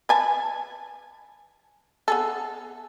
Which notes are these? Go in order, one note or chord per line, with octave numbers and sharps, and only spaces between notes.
B4 G#5 A5
B3 G#4 A4